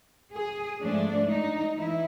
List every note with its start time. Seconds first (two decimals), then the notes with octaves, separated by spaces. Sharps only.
0.34 G#4
0.81 G#2 F3 A3 D4
1.28 D#4
1.75 E3 E4